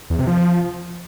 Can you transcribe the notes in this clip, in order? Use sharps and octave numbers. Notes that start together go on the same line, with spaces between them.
E2
C3
F3